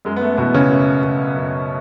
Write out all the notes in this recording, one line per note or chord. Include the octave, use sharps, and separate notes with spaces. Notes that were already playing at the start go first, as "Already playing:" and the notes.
F#2 G#3
B3
A3
B2 E3 B3
C#3 C#4
F#2
C#3
F#2